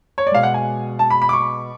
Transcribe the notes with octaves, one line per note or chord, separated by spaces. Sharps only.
C#5
D5
B2 G#3 F5
F#5
G#5
A5
B5
B5
D6
C#6